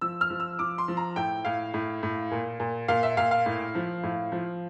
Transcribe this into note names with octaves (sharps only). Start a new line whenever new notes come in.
F3 E6
F6
F3
E6
F3 D6
C6
F3
A#5
A2 G5
A2 F5
A2
A2
A#2
A#2
A#2 F5
E5
A#2 F5
F5
A2
F3
A2
F3